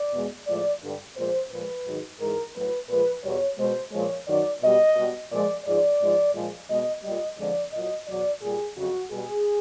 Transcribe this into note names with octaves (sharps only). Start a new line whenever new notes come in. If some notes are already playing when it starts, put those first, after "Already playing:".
Already playing: D5
E2 B2 G#3
A2 F3 G#3 D5
G2 D3 G3
A#2 F3 G#3 C5
A#2 F3 G#3 B4
G#2 D#3 F#3
G#2 E3 G#3 A#4
A2 F#3 B4
A#2 F3 G#3 B4
E2 B2 G3 C#5
B2 G#3 C5
A#2 F3 G#3 C#5
F#2 D#3 F#3 D5
B2 G3 D#5
B2 G3
A#2 F3 G#3 D5
G#2 F3 G#3 D5
G#2 F3 G#3
A#2 F3 G#3
B2 G#3 D#5
A#2 G3 D#5
F2 D3 F3 G#3 D5
A#2 F#3 D#5
E2 B2 F#3 D5
A#2 G3 G#4
F2 C#3 F#3 F#4
B2 G3 G#4